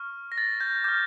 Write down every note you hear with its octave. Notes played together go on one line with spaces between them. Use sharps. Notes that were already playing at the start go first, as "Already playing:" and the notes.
Already playing: C#6 F6
A#6
A6
G6
D6 F6 G6